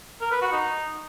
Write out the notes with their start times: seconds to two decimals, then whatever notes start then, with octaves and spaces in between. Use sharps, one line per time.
0.21 A#4
0.31 B4
0.42 F#4
0.52 D#4